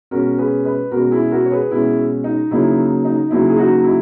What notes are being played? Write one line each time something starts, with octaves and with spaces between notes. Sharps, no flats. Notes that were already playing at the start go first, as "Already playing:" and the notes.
B2 G#3 C#4 F#4 A#4
G#4 B4
B4 D#5
B2 G#3 C#4 F#4 A#4
E4 G#4
F#4 A#4
C#5
G#4 B4
B2 G#3 C#4 E4 G#4
D#4
C#3 F#3 A#3 D#4 E4
D#4
C#3 F#3 A#3 D#4 E4
G#4
D#4 F#4
E4